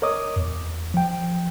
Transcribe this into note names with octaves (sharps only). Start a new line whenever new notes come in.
A#4 C#5 D#5 D6 D#6
E2
F3 G5